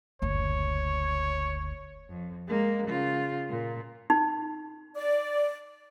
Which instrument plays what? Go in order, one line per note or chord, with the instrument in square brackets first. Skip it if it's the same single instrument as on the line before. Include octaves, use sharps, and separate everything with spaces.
[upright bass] F#1 D2 [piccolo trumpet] C#5
[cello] F2
G#3 A#3
C#3 F4
A#2
[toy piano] D#4
[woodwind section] D5